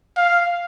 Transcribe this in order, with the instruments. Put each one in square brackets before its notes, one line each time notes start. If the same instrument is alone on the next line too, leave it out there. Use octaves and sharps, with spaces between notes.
[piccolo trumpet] F5